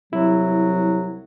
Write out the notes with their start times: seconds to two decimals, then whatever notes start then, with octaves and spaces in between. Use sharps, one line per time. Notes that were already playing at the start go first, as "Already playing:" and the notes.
0.13 C2 F#3 E4